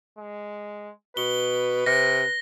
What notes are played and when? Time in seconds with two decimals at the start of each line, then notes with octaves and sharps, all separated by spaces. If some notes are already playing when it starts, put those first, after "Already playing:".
0.18 G#3
1.17 B2 B4 G7
1.86 C3 A#6